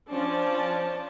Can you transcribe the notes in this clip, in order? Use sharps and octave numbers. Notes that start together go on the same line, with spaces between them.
F3 C#4 D4 A5